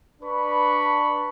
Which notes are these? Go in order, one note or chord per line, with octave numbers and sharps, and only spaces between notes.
D4 B4 B5 C#6